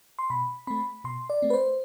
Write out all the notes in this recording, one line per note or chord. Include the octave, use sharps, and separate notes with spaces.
C6
B2 B5
A3 C4 B5
B2 C6
D5
A3 C4
B4
C5